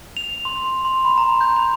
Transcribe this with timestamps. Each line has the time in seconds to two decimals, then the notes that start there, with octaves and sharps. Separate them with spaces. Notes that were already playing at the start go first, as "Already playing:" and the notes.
0.17 F7
0.45 C6
0.85 C6
1.05 B5
1.18 A#5
1.41 G6
1.56 B5